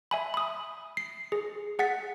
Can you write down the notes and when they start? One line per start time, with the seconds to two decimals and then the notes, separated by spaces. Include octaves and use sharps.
0.11 E5 G#5 B5
0.34 B5 D#6
0.97 C7
1.32 G#4
1.79 G#4 F#5 A6 B6